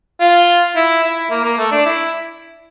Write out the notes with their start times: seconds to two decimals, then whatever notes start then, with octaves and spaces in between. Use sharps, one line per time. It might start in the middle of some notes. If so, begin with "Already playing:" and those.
0.20 F4
0.76 E4
1.03 E4
1.30 A#3
1.44 A#3
1.58 A3
1.72 D4
1.86 E4